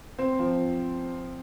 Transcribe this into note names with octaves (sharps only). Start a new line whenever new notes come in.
C4
F3